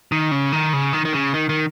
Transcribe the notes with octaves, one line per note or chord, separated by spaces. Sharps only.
D#3
C#3
D#3
C#3
D#3
D#3
C#3
D#3
D#3